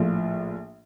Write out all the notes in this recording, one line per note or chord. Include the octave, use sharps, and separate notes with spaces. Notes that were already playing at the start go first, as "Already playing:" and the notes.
Already playing: A#1 A2 F3